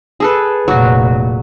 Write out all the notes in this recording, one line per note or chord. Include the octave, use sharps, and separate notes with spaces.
G#4 A4 B4
F1 A#2 F#3 F#4